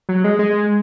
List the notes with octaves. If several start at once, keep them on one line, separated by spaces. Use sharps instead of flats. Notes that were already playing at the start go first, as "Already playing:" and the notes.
F#3
G#3
G#3